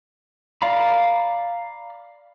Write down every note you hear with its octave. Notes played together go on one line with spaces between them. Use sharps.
D5 F5 A#5 B5